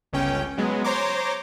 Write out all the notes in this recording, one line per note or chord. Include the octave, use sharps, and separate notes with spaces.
G1 C#2 C#4 G5
F#3 G#3 B3
C5 C#5 A#5 C6 D6